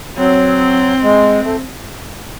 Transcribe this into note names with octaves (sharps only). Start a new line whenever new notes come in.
F#3 C4
G#3
A3